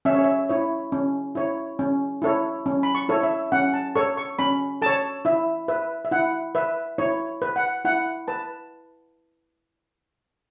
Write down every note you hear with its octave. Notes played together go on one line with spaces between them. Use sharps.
C#4 E5
C#5
E5
E4 C#5
C#4
E4 C#5
C#4
E4 A4 C#5
C#4
B5
C#6
E4 A4 C#5
E5
C#4 F#5
A5
A4 C#5 C#6
C#6
C#4 B5
A4 C#5 A5
E4 E5
B4 E5
E5
E4 F#5
B4 E5
E4 C#5
B4
F#5
E4 F#5
B4 A5